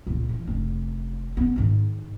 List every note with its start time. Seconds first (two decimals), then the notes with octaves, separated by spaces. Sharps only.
0.07 C#2 A#2
0.29 E3
0.47 F1 D4
1.37 B3 C#4
1.56 G#2 D#3